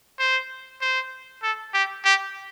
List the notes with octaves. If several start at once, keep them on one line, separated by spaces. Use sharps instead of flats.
C5
C5
A4
G4
G4